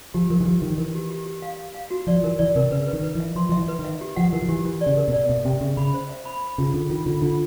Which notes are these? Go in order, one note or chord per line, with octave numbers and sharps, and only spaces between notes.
F3 G4
F3 A#4
E3
F3 G4
D#3 G4
E3 A#4
G4
G4
G4
F5
F5
F5
F#4
F3 D5
E3 A#4
E3 D5
C3 A#4
C#3 B4
B4
D#3
B4
E3
E5
F3 C6
F3 E5
E3
B4
D#3
E5
G4
F3 F#5
E3 A#4
F3
E3 G4
E3 G4
D5
C#3
A#4
B2
D5
B2 E5
C3 G5
C#3 E5
C#3 B5
C5
E5
B5
B5
C#3 F4
D3 G#4
D#3 F4
D3 F4
D3 F4